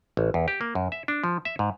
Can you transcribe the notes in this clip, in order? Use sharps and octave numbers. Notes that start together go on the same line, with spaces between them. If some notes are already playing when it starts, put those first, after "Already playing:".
A1
E2
G4
A#3
F#2
E5
D4
F3
E5
G#2